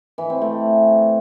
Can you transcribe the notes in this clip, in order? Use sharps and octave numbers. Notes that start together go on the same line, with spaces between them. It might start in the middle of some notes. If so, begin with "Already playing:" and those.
E3
C4
A3